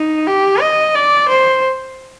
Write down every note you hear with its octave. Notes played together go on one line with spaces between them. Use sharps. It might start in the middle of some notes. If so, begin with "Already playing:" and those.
Already playing: D#4
G4
D#5
D5
C5